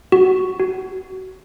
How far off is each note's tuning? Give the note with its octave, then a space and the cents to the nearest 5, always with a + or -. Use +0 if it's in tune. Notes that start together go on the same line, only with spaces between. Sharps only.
F#4 +10
F#4 +25